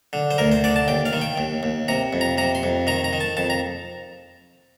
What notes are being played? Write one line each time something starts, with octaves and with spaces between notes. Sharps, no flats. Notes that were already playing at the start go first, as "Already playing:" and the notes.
D3
C5
D2 A#4
C5
D3 D5
A5
D#2 G5
F5
D#3
G5
D#2
D#2
C3 A#5
F2
A#5
C3 A#5
C6
F2
D#3 A#5
A#5
D#3
A5
F2 A5
A#5